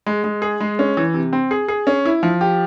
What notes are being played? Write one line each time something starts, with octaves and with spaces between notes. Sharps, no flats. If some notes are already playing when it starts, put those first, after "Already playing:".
G#3
G#3
G#4
G#3
C#4
E3
C3
C4
G#4
G#4
C#4
E4
F3
G4